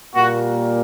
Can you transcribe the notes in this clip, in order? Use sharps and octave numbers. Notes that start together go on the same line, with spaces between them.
A#2 G3 A#3 F#4